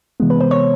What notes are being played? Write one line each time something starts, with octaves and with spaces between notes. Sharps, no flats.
C3 E3 G#3 B3
B4
C5
C#5